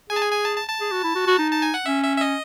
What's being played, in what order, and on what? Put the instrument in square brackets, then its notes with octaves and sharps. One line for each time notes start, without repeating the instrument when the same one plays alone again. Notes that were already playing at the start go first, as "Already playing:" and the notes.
[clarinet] G#4 [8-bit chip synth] G#5
[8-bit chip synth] A5
G#5
G#5
A5
A5
A5
[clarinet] G#4
F#4
E4
F#4
F#4
D#4
[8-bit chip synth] A5
G#5
F#5
[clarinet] C#4 [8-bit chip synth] E5
[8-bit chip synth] E5
E5
D#5